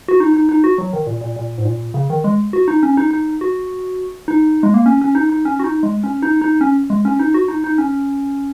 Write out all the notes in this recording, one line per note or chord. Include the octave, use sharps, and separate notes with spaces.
F#4
D#4
D#4
D#4
F#4
F#3
D#3
A#2
A#2
A#2
G#2
A#2
C#3
D#3
G#3
F#4
D#4
C#4
D#4
D#4
F#4
D#4
G#3
A#3
C#4
C#4
D#4
D#4
C#4
F#4
D#4
G#3
C#4
D#4
D#4
C#4
G#3
C#4
D#4
F#4
D#4
D#4
C#4